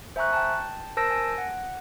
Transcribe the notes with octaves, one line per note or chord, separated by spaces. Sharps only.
C5 E5 G#5 A#5 C#6 F#6
G5 A5
A#4 C5 A5 E6 A#6 D7
G#5 A#6 D7
F#5